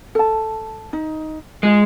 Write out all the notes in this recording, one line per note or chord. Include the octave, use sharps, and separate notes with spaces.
A4 A5
D#4
G#3 F4 G#4